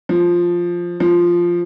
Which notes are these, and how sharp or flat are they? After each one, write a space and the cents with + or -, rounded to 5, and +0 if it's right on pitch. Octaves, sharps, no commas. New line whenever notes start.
F3 +0
F3 -5